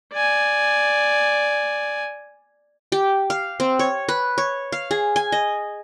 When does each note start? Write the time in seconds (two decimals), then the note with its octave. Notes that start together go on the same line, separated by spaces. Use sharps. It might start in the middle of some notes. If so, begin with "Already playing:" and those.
0.13 D5 G#5
2.92 G4
3.30 F5
3.60 C4
3.79 C#5
4.09 B4
4.38 C#5
4.72 F5
4.91 G#4
5.16 G#5
5.32 D#5